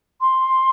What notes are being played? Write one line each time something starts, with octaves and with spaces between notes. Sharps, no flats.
C6